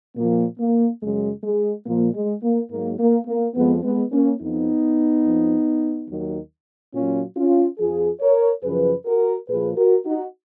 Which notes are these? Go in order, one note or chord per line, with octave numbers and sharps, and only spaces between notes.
A#2 F3 A#3
A#3
F#2 C#3 F#3 G#3
G#3
A#2 F3 A#3
G#3
A#3
G#2 F#3 A#3
A#3
A#3
F2 F3 G#3 B3
G#3 B3
A#3 C#4
F2 F3 B3 D#4
F2 F3
D#2 D#3 F#3
A#2 F#3 C#4 F4
C#4 F4
F2 F3 F4 G#4
A#4 C#5
F#2 C#3 F3 G#4 B4
F#4 A#4
A#2 F3 G#4 B4
F#4 A#4
D#4 F#4